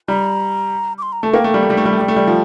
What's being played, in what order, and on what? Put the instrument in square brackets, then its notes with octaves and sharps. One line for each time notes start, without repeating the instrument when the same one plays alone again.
[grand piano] G3 [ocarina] A#5
[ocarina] D6
C6
A#5
[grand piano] A3 [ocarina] A5
[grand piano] A#3 [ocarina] G5
[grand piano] A3
G3
A3
G3
A3
G3
A3
[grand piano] G3 [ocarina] G5
[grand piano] A3
G3
F3